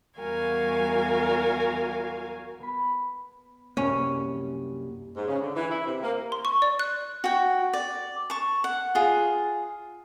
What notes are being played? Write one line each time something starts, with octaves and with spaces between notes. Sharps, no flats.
E2 G3 F#4 A#4 F5 G#5
B3 B5
C2 F#2 G3 A#3 C#4
G#2
C#3
D3
E3
E4
C3
A#3
C6
C#6
D5
F#6
F#4 G5
D5
A5 C#6
F#5
F4 G#4